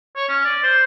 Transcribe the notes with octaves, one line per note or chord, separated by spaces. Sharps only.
C#5
C#4
D5
C5